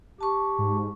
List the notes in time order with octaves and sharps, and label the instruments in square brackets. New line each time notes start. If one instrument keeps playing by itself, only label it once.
[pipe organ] G4 [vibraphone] A5 C#6
[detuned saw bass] G#2